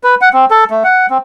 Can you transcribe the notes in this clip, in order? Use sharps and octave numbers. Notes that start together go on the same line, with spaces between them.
B4
F#5
C4
A4
A3
F#5
C4